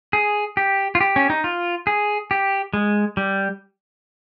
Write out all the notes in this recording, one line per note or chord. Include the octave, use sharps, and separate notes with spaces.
G#4
G4
F4
G4
C#4
D#4
F4
G#4
G4
G#3
G3